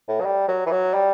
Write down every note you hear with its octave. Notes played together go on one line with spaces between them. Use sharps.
A2
F#3
G3
F#3
E3
F#3
G3